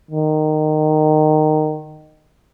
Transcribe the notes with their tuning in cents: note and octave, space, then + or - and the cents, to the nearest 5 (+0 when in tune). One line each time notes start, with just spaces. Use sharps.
D#3 -15